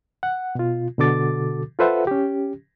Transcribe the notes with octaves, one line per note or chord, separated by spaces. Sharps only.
F#5
B2 F4
B2 D3 F#4 A4 D6 A6
F4 A4 B4 C5 E5 F#5
C#4 G4